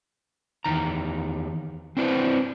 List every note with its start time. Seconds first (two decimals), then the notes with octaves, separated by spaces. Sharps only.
0.64 E2 D#3 A#5
1.97 C4 D4 E4 B4 C5